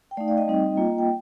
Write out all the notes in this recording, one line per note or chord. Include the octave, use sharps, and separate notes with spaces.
G5
A3 D#4 D5 F5
D5 F5
D#5 G5
G3 C4 D#4
A#3 F4
G5